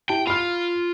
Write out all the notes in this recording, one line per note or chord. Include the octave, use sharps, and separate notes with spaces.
E4 G4 G5 A5
F4 B5 F6